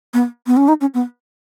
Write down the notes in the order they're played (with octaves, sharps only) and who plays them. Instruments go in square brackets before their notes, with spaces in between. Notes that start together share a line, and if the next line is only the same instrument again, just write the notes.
[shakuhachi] B3
B3
C#4
D#4
C#4
B3